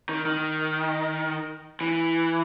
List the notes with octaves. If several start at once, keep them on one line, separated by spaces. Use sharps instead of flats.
D#3
D#3
E3